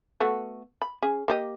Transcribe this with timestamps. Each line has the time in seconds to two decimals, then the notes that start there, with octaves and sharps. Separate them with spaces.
0.20 A3 B3 F#4
0.82 B5
1.02 C#4 G#4
1.28 A#3 G4 D#5